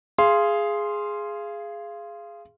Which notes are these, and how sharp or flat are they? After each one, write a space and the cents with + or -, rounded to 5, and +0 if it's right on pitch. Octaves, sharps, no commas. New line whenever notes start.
G#4 +0 F5 -25 C6 +0